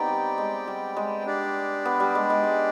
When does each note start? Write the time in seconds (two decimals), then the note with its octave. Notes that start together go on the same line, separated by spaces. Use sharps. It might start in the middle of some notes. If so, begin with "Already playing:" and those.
Already playing: B3 C4 D#4 G4 D5 G5
0.08 G3
0.38 G#3
0.68 G3
0.97 G#3
1.26 D4 G4 D5
1.85 B3
2.00 G3
2.15 G#3
2.30 G#3
2.44 G#3